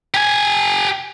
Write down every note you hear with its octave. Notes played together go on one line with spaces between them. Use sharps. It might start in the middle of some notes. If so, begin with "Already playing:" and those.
G4 G#5